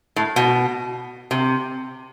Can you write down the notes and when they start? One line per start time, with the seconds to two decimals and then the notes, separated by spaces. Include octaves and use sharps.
0.16 A2
0.36 B2
1.31 C3